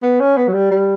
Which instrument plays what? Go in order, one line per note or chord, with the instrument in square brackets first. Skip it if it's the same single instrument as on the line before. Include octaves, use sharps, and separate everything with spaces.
[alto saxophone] B3
C#4
B3
F#3
G3
G3